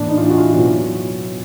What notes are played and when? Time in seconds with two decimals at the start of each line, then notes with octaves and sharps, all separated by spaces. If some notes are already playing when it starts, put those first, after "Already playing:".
Already playing: A2 E3 A#3 D4
0.08 D#4
0.17 F4
0.22 E4
0.30 F#4
0.38 F4
0.53 B2 F#3 B3